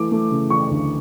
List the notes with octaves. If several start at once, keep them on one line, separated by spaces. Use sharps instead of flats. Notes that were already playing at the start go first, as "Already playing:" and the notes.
Already playing: E3 A3 D6
A3
C#3
E3 C#6
D2